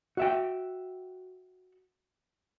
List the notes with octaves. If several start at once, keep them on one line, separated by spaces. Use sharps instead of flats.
F#4 E5 G5